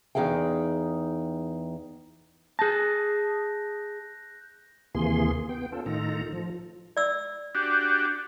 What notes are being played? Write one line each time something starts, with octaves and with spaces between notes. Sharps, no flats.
E2 D#4 G#4 F5 G5
G#4 A5 F#6 G6 A#6
D#2 C3 E3 A#3 G#4 C6
B3 G5
C#4 F4 A4
A2 D#3 D#4 F4 A4 A#5
F3
D5 E6
D4 F#4 G4